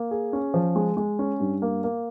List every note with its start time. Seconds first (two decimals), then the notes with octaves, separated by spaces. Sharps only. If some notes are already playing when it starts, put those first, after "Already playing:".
Already playing: A#3
0.11 G#4
0.33 C#4
0.54 F3
0.76 G#3
0.97 G#3
1.19 C#4
1.40 G2
1.62 A#3
1.84 A#3